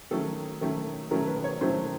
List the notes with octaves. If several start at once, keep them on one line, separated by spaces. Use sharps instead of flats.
D#3 F#3 A3 C#4 A4
D#3 F#3 A3 C#4
D#3 F#3 A3 C#4 A#4
B4
C#5
D#3 F#3 A3 C#4 C5